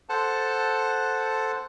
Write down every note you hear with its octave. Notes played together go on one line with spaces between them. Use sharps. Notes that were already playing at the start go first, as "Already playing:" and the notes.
A4 C5 F#5 A5